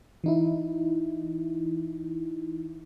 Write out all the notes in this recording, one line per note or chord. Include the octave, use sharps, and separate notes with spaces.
E3 D#4 E4